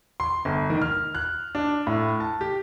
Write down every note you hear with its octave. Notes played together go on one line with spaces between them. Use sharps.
C6
G1
D#3
F6
F#6
D4
A2
A5
G4